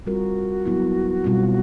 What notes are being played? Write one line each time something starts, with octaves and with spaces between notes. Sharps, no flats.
G3 C4 F4 F#4 A#4
F#3 B3 E4
B2 G3 C4 F4